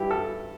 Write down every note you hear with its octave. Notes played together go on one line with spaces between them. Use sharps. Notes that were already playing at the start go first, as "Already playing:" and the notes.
Already playing: G2 E3 E4 G4
A4